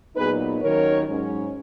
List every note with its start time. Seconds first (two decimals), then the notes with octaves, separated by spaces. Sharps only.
0.16 A#2 F#3 B3 D#4 G#4 B4
0.61 D#2 D#3 F#3 C#4 A#4 C#5
1.07 G#2 F#3 C#4